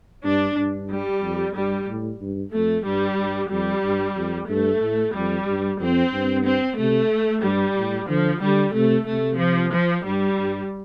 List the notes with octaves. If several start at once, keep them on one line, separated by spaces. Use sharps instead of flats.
G2 D4
G2
G3
F2
G2 G3
A2
G2
F2 A3
G2 G3
G2
F2 G3
G2
F2
G2 A3
A2
F2 G3
G2
F2 C4
G2
C4
C3 A3
G2 G3
A2
D3 F3
D3 G3
C3 A3
C3 A3
F3
F3
G2 G3
G2